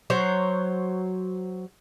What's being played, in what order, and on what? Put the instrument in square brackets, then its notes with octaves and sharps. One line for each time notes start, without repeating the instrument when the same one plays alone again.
[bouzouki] F#3 C5 C#5